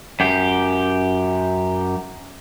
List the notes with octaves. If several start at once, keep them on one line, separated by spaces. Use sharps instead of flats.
F#2 G4